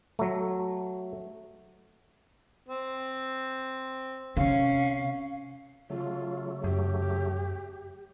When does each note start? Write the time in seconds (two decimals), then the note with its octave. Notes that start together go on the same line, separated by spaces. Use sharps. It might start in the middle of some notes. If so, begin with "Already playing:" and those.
0.19 F#3 A3
2.68 C4
4.37 C3 C#4 F5
5.90 C#3 F#3 A3 F4
6.64 F#2 G4